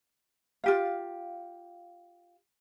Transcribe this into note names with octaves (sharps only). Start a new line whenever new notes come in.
F4 G4 F5